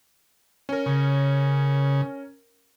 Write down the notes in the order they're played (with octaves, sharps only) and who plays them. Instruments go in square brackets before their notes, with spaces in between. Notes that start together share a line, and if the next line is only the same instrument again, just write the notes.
[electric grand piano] C#4 A#4
[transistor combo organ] C#3